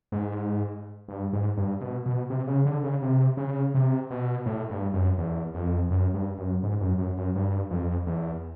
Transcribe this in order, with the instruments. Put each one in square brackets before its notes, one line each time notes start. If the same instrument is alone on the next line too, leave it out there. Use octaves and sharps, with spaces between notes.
[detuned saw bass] G#2
G2
G#2
G2
B2
B2
C3
C#3
D3
C#3
C3
C#3
C3
B2
A2
G2
F#2
E2
F2
F#2
G2
F#2
G#2
F#2
F#2
F#2
G2
F2
E2